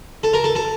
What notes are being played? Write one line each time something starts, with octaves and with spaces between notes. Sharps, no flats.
A4
A#4
A4
A4